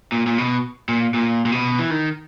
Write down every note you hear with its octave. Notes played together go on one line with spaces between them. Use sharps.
A#2
A#2
B2
A#2
A#2
A#2
B2
E3
D#3